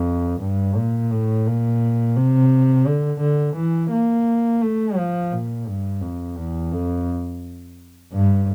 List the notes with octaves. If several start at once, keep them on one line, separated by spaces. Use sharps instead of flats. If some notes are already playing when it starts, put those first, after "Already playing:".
Already playing: F2
G2
A#2
A2
A#2
C3
D3
D3
E3
A#3
A3
F3
A#2
G2
F2
E2
F2
G2